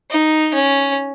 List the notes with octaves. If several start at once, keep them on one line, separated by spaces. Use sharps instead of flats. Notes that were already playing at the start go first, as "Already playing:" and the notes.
D#4
C#4